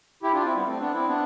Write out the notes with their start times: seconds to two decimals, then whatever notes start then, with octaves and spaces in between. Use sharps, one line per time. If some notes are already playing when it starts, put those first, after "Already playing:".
0.23 E4 G4
0.33 D4 F4
0.44 C4 E4
0.55 G3 B3
0.65 A3 C4
0.79 B3 D4
0.94 C4 E4
1.07 B3 D4